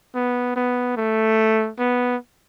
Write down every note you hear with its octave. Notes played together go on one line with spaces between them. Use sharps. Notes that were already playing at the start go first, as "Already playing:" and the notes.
B3
B3
A3
B3